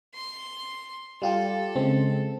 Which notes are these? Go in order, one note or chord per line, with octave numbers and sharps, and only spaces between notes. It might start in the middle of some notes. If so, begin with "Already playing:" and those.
C6
G3 F4 G4 A4
C#3 G#3 C4